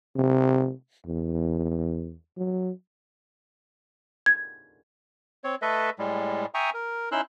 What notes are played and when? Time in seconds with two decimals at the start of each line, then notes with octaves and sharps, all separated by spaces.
0.16 C3
1.06 E2
2.37 F#3
4.26 G#6
5.44 C4 C#5
5.62 A3 A4 B4 D#5 E5
5.99 A2 G3 G#3
6.54 E5 G5 G#5 A#5 C#6 D#6
6.74 A#4
7.12 C#4 D#4 E4 C6 E6 F#6